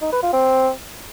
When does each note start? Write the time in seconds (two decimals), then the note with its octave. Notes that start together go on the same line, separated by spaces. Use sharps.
0.02 D#4
0.13 B4
0.23 F4
0.33 C4